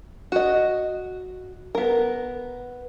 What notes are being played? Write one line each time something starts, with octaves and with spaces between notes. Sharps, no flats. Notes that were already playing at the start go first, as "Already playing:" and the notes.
F#4 D#5
B3 A#4